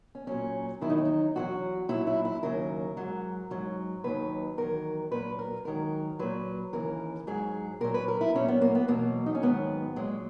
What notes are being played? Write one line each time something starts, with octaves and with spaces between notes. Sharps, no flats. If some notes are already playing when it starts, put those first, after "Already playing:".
C#4
A#2 F#3 C#4
E2 D#3 F#3 E4
D#4
C#4
D#4
E2 D#3 F#3 F#4
A#2 F#3 E4
E4
E4
D#2 C#3 F#3 A#4
G#2 F#3
G#2 F#3
D#2 D#3 F#3 B4
E2 D#3 F#3 A#4
A#2 F#3 B4
A#4
G#2 D#3 F#3 A#4
A#2 F#3 B4
D#2 C#3 E3 A#4
G#2 F#3 G#4
A#2 F#3 A#4
B4
A#4
E4
A#2 F#3 C#4
B3
A#3
B3
E2 B2 F#3 A#3
D#4
C#4
G#2 D#3 F#3 B3
A#2 F#3 G#3